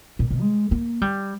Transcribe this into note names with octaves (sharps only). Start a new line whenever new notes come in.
A#2
A#2
G#3
A#3
G3